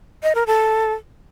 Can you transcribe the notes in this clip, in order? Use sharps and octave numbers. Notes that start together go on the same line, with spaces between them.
D#5
A#4
A4